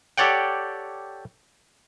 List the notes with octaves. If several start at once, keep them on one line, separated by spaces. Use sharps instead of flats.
G4 A4 C#5 D5 F#5 G5